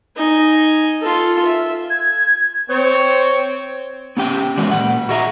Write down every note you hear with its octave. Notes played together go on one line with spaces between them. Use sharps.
D#4 G#5
F4 A4
E5
G#6
C4 C#5
B3 C#4 G4 G5
E3 G#3 C#4 F#4 D5
A#2 F#5
F#4 G#4 D#5 E5 A#5